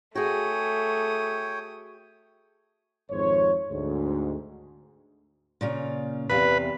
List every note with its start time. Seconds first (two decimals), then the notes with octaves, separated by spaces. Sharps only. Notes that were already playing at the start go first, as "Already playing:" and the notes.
0.15 A3 F#4 G#4 C#5 G5 D#6
3.10 G#1 F2 G#2 C5 C#5
3.69 D2 G#2
5.61 A#2 C#3 F4
6.29 E2 C3 B4 F5